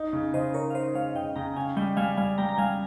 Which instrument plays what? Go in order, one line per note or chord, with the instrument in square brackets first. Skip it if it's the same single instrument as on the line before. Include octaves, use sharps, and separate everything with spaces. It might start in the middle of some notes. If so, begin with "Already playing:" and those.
Already playing: [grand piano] D#4
C#3
[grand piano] C#3 [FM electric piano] C5 D#5
[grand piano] D#4 [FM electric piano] A#4 C#5
[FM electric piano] F5
[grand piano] D#4 [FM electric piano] C5 D#5
[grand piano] G#3 [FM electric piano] C#5 F5
[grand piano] C#3 [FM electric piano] D#5 G5
[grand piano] C#3 [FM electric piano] G5 A#5
[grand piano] C#4 [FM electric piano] F5 G#5
[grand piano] G3 [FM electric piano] D#5 G5
[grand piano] G3 [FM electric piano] F5 G#5
[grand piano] G3 [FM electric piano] F5 G#5
[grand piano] G3 [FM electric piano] G5 A#5
[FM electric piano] A#5
[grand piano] G3 [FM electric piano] F5 G#5